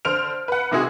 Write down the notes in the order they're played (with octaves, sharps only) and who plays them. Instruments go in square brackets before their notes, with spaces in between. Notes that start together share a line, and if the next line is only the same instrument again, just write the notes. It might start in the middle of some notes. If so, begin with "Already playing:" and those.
[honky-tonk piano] D3 C5 F6 D7 F7
B4 F#5
C3 D#3 G#3 E4 F#4 G#4